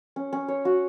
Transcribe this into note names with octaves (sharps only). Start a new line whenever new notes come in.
C#4
C#4
C#5
F#4